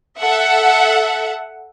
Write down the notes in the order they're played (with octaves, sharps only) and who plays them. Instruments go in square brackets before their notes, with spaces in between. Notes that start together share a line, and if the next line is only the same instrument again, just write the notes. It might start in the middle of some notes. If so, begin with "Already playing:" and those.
[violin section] A4 E5 F#5